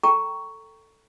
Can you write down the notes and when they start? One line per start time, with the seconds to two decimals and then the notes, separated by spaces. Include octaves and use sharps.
0.03 A4 G5 A#5 C#6